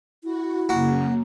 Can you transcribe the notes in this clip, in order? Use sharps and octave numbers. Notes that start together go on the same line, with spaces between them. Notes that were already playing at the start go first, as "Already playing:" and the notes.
E4 F#4
F#2 C#3 A#3 F#4